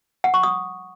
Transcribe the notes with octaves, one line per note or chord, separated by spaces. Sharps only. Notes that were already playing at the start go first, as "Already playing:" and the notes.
F#5
C#6
D#6